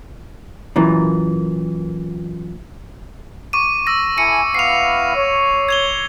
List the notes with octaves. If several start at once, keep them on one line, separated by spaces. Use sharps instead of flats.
F#2 A#2 E3
C#6 D6 D#7
E6 A#6
E4 A4 G#5 C#7 D#7
B3 E4 F5 C7 F7
C#5
G#6 F7 G7